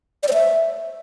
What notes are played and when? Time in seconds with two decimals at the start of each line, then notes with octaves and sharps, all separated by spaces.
0.23 D5
0.28 C5
0.33 E5